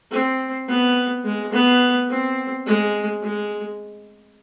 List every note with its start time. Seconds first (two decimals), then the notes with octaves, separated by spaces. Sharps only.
0.11 C4
0.68 B3
1.24 G#3
1.53 B3
2.09 C4
2.66 G#3
3.22 G#3